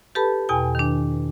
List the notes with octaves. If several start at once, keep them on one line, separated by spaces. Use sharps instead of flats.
G4 A4 B4 A5 B5
E2 B2 G5 G#5
D#3 D4